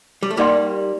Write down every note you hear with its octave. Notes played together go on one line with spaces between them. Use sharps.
G3
A3
G3 A#3 D#4 G4 D5 G5 C6